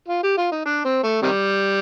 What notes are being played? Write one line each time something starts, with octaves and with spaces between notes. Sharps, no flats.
F4
G4
F4
D#4
D4
C4
A3
C3 D#3 G3